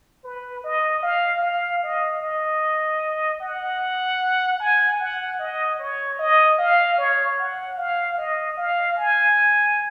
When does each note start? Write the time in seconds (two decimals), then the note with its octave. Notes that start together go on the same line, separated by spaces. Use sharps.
0.24 B4
0.64 D#5
1.03 F5
1.42 F5
1.83 D#5
2.22 D#5
3.41 F#5
4.60 G#5
4.99 F#5
5.39 D#5
5.79 C#5
6.19 D#5
6.58 F5
6.98 C#5
7.38 F#5
7.78 F5
8.18 D#5
8.57 F5
8.97 G#5